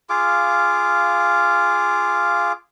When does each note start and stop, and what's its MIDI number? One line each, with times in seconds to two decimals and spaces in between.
0.10 2.52 65
0.10 2.52 68
0.10 2.52 77
0.10 2.52 86